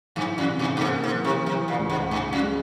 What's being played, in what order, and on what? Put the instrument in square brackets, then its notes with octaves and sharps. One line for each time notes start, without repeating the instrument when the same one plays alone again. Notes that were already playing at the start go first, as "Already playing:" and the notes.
[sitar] G2 [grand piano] E3
[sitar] F2
[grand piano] C3
[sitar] G2
G2
[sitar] G#2 [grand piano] A#3
[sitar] G#2
[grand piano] E3
[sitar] C3
[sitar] C3 [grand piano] E3
[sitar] A#2
[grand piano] C#2
[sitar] G#2
[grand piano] C#2 [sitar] G2
[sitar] F2
[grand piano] G#3